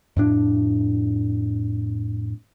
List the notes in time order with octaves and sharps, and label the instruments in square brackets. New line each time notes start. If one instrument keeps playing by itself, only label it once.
[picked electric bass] F2 A2 D4